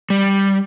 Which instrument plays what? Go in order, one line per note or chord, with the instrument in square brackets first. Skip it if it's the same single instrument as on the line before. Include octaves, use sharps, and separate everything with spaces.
[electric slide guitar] G3